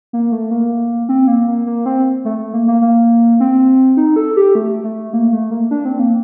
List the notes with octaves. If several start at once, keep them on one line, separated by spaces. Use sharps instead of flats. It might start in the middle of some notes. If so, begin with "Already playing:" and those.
A#3
A3
A#3
C4
A#3
A#3
A#3
C4
A3
A3
A#3
A#3
A#3
C4
D#4
A4
G4
A3
A3
A#3
A3
A#3
D4
C4
A#3